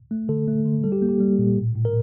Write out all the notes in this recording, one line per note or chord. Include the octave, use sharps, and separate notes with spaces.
A3
D3 A4
A3
D3
G3 A4
G4
A#3
G4
G3
A#2
A2
A2
A#4